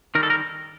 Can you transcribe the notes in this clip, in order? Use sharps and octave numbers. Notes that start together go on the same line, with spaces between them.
D#3 G3 A#4
A4
A#4